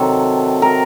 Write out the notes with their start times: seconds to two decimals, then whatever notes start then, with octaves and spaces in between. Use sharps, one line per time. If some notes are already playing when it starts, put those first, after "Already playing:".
Already playing: C3 D#3 F#3 A4
0.62 A#4